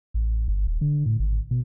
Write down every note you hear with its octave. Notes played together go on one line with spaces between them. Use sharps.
A1
G1
D#1
D3
A2
G#1
B2